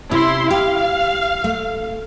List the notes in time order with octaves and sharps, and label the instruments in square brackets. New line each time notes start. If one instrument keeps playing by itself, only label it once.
[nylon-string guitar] C3 C#4 [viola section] E4 C6
[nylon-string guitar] G4 [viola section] F5
[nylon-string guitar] A3